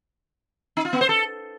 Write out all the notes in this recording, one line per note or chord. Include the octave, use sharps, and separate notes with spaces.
D#4
F4
B3
C5
A4